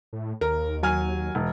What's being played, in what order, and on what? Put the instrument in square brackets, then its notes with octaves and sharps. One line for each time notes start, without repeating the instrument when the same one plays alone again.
[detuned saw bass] A2
[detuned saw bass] D#2 [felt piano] A#4
[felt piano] F#3 G#5 F6
E1